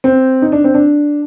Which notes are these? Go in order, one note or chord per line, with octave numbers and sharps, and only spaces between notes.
C4
D#4
D4
C4
D4